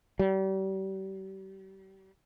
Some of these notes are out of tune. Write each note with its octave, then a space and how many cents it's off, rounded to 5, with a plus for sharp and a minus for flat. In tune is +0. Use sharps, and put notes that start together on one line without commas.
G3 -35